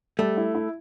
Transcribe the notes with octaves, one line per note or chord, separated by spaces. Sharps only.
G3 A3
E4
E4